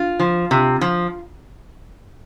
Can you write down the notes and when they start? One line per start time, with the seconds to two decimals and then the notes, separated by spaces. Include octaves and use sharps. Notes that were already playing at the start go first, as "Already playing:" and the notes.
Already playing: F4
0.19 F3
0.51 C3
0.81 F3